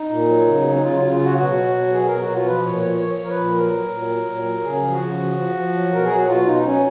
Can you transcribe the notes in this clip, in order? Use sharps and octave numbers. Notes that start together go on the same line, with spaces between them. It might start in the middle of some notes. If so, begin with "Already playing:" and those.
Already playing: D#4
A#2
F#3
C#3
B3
F#3 C#4
D#4
C#3 F4
C#3 F4
F4
F#3 F#4
B2 F#4
F#3
B2
F#3 G#4
B2 A#4
F#4
B2 F4
F3 B4
A#2 C#5
F3 C#5
F3 C#5
F3 A#4
B4
A#2
F#3 A#4
F#3
A#2
F#3
A#2
F#3
C#3 G#4
F3
F#4
C#3
F3
F3
F3
F#3
B2 A#4
G#4
F#3
F#4
B2 F4
B2 D#4
F#3 C#4